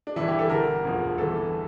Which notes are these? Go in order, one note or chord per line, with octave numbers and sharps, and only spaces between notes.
D4
G1 G2 E3 E4
G4
A4
G1 G2 D3 A#4
E1 D2 D3 F3
G1 G2 E3 A4